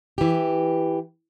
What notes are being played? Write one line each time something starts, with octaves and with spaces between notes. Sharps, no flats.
E3 G4